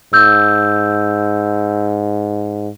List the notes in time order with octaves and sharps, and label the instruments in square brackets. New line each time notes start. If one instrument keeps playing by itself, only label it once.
[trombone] G#2 [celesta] E6 G6